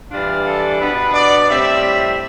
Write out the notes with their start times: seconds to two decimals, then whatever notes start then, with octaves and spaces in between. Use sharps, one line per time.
0.11 E3 G3 D4 F4
0.45 A4
0.80 B2 B3 D4 B4
1.14 D5
1.49 A2 G3 C4 E5